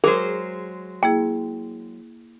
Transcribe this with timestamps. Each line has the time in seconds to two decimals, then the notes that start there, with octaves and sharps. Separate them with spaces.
0.04 F#3 G#3 G#4 A#4 C5
1.03 A#3 E4 G#4 G5